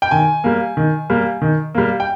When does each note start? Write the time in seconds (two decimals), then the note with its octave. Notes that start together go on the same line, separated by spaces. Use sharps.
0.02 G5
0.11 D#3 G#5
0.44 G3 A#3
0.77 D#3
1.10 G3 A#3
1.42 D#3
1.75 G3 A#3
2.00 G5